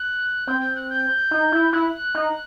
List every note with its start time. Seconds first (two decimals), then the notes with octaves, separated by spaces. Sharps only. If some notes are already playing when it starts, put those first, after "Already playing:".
Already playing: F#6
0.47 C4 G6
0.61 G6
0.76 F#6
0.90 G6
1.31 D#4
1.52 E4
1.73 E4 F#6
2.15 D#4